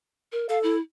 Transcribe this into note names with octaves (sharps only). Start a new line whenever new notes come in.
A#4
A4 F5
E4